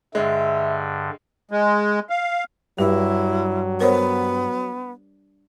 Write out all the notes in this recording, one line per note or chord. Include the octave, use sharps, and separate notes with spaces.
G2 D3 G#3 E5
G#3
F5
G2 F#3 E4 G4
B3 A#4 C5 C#5